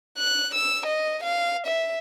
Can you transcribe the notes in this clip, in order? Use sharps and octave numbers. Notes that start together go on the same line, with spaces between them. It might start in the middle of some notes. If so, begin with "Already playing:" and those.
F#6
E6
D#5
F5
E5